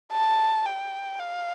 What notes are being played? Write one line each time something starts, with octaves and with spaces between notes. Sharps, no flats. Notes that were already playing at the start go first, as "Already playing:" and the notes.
A5
G5
F5